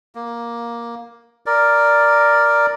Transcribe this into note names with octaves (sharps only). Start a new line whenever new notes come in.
A#3
A#4 D5